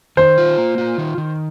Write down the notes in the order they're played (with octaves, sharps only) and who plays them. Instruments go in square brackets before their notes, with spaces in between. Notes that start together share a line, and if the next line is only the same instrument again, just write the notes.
[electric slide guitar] D#3 [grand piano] C5
[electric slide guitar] F4
A#3
F4
D#3
D#3